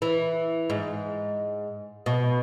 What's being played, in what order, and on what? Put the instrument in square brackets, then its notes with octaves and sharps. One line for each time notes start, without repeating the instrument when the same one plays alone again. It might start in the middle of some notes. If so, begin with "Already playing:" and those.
[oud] E3
G#2
B2